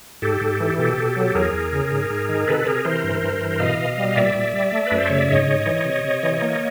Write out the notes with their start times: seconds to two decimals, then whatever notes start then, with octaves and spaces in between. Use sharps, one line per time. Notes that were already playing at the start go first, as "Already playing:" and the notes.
0.22 G#2 G4 A4
0.41 G#2
0.60 E3
0.78 B2 G4 A4
0.98 B2
1.16 F#3
1.35 E2 G#4 A#4
1.54 E2
1.72 C#3
1.91 G#2
2.10 G#2
2.29 D#3
2.48 C3 A4 B4
2.66 C3 G#4 A#4
2.85 E3 A#4 C5
3.04 G2
3.23 G2
3.41 E3
3.60 B2 D#5 F5
3.79 B2
3.98 G3
4.16 A#2 D5 E5
4.35 A#2
4.54 G3
4.72 A3
4.87 F#2 B4
4.98 C5
5.08 C#3 C#5
5.19 D5
5.29 G#2 C#5 D#5
5.47 G#2
5.66 E3
5.85 C3
6.04 C3
6.23 E3
6.42 A#3